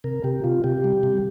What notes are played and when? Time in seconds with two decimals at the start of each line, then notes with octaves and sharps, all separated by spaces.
0.04 C3 A#4
0.24 C3 G4
0.44 C3 F4
0.64 C3 G4
0.84 G3
1.03 C3